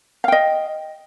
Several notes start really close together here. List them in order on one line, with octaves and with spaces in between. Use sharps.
F5 G5 D#5